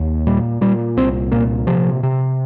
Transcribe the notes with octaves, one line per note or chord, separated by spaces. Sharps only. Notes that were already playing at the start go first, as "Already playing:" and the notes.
Already playing: D#2
A#2 G3
A#2 G3
C2 C4
A#2 A#3
C3 F3
C3